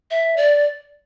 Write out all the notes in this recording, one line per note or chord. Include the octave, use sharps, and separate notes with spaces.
E5
D5